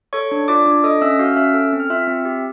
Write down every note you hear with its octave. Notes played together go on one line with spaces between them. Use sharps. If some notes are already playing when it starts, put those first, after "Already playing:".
A4 C#5 C#6
D4
F4 D5 D6
D4
A4 D#5 D#6
C#4 E5 E6
F#4 F5 F6
F6
C#4 E5 E6
A4
C4
F6
F4 E5 E6
C4
G4